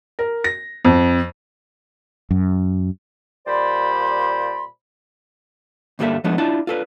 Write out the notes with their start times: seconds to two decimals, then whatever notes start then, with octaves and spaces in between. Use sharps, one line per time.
0.19 A#4
0.44 A#6
0.85 F2
2.31 F#2
3.47 A#2 G3 C5 D5 B5 C6
5.99 D2 G2 G3 A#3 A4 E5
6.24 F3 G#3 A3 B3 D4
6.38 D4 E4 F4 A5
6.67 F4 A4 B4